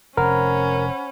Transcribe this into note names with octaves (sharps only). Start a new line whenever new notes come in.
F1 C#4 A#4 C5 F#5 B5